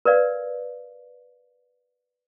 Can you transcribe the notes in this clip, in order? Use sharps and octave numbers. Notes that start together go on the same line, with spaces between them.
A#4 B4 D5 F5